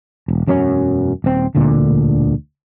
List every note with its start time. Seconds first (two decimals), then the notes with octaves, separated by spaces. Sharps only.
0.28 E1
0.47 E1 F#2 F#3 C#4
1.24 D#1 C4
1.55 E1 D2 A#2 D3